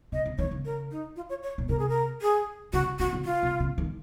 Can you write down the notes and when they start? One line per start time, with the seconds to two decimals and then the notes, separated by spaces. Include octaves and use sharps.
0.12 C3 D#5
0.26 C#3
0.38 D#3 C#5
0.51 C#3
0.65 A#4
0.91 D#4
1.16 F4
1.30 C#5
1.43 C#5
1.58 A#2
1.69 C3 A#4
1.79 G#4
1.89 A#4
2.22 G#4
2.73 C#3 F#4
2.99 C#3 F#4
3.13 C#3
3.25 F4
3.43 C3
3.60 C#3
3.78 D#3